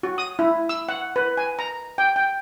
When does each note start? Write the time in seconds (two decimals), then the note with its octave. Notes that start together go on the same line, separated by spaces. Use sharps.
0.03 F#4
0.18 D#6
0.39 E4
0.69 E6
0.89 F#5
1.16 B4
1.37 G#5
1.59 A#5
1.98 G5
2.16 G5